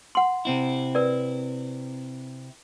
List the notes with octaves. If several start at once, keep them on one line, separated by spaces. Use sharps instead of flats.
F#5 C6
C3 C4 E4
A#4 B4 D5